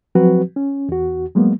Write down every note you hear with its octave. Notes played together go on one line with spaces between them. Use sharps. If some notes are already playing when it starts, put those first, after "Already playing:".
F3 F#3 C4 F#4 B4
C#4
E2 F#4
F#3 G#3 A#3 B3